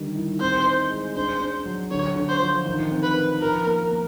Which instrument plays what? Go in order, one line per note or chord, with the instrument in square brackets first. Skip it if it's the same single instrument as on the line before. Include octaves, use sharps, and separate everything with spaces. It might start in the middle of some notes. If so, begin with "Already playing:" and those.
Already playing: [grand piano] D3 D#3 G3
E4
[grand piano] C4 [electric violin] C5
[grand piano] D#4
G#3
[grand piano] D4 [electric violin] C5
[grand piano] D4
F#3
[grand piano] D3 [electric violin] C#5
[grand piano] D3
[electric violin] C5
[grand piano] F3
D#3
C4
[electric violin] B4
[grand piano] D#4
[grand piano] F3 [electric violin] A#4
[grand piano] A#3
A#3